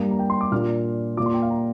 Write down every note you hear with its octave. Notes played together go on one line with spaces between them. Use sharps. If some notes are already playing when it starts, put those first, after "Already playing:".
Already playing: G2 G3 A#3 F5
A#5
G5
C6
D6
A#2 A#3 D4 F4 F6
A#2 A#3 F4 D6
C6
G5
F5
A#5